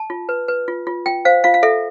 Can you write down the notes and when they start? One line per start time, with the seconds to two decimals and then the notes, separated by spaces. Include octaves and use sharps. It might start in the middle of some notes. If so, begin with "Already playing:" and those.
Already playing: A5
0.10 F4
0.29 B4
0.48 B4
0.68 F4
0.87 F4
1.06 F4 G5
1.25 C5 F5
1.44 F4 F5
1.54 F5
1.63 A4 E5